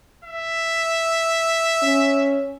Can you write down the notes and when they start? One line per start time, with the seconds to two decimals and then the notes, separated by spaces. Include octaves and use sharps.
0.24 E5
1.82 C#4